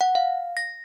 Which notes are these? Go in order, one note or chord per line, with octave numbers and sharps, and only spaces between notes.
F#5
F5
A#6